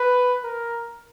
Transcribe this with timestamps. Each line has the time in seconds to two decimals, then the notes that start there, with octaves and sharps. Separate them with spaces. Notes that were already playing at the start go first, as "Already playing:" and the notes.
Already playing: B4
0.43 A#4